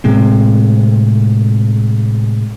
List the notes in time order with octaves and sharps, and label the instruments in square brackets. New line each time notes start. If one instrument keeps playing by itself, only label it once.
[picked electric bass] A2 C3 G#3 C4